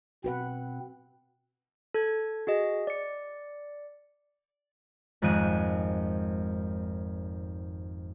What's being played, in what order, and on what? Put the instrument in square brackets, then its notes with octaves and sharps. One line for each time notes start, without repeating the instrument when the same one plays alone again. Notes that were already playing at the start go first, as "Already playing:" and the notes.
[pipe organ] B2 C4 [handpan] F#4 B4 F#5
[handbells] A4 G#6
F#4 G#4 D#5
D5 C#7
[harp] G#1 F2 G#3 F#6 D#7